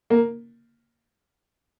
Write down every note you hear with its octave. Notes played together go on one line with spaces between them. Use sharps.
A#3